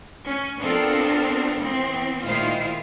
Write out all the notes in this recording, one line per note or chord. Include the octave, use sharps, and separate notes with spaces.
C#4
B3 C4 D4 F4 A4 A#4
E3 B3 C4
A#2 D#3 G#3 E4 F4 C5